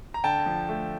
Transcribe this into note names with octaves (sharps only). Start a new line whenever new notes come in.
A#5
D3 G5 A5
F3
A3